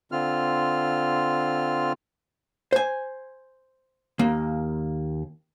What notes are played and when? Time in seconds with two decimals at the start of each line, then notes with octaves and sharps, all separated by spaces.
0.12 D3 C4 F4 F6
2.72 C5 G#5
4.19 D#2 A#3